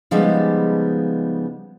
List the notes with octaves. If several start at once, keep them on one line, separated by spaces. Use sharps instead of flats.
C#3 F3 G3 G#3 B3 D#4